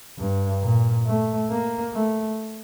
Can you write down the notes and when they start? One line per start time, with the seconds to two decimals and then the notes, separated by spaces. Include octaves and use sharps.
0.19 G2
0.63 A#2
1.06 A3
1.50 A#3
1.93 A3